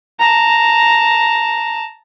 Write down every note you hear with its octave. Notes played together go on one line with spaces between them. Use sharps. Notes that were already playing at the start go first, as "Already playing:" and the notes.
A5 A#5